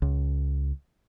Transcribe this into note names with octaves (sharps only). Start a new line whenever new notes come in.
C#2